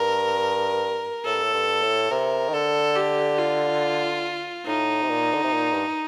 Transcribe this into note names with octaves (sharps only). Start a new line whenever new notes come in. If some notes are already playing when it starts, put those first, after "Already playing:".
Already playing: G2 A#4
A2 A4
G2
A2
G2
A2
C3 A#4
D#3
D3 A4
G4
F4
A2 D#4
C3
A#2
D3
C3
A#2
G2